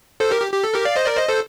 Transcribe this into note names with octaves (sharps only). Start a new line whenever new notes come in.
A4 C5
G4 A#4
G4
G4
A4
G4 A#4
D5 F5
C5 D#5
A#4 D5
C5 D#5
A4 C5